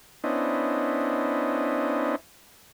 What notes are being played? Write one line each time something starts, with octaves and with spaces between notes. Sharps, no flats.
B3 C#4 D4 E4 C5 D#5